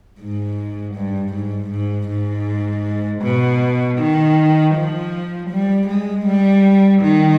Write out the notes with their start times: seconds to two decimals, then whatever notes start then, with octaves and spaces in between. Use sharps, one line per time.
0.20 G#2
0.95 G2
1.34 G#2
1.70 G#2
2.08 G#2
3.22 B2
3.99 D#3
4.75 F3
5.50 G3
5.88 G#3
6.26 G3
7.02 D#3